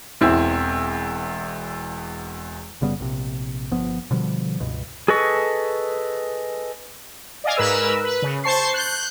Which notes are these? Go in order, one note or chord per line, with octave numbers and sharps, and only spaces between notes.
E1 E2 C4 E4 E6
F#1 C#3 G3 B3
A#1 C3
G1 F3 B3
B2 D3 F3 G3
C#2 G2 B2
G#4 A4 B4 D#5 C#6
D5 D#5 F5 G#5
G#2 A#4 B4 E6
B4
C#3
C5 A5 C#6 C7
F#6 G6